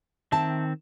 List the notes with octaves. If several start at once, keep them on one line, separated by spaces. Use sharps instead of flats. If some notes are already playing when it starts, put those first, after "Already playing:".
D#3 C4 E5 A5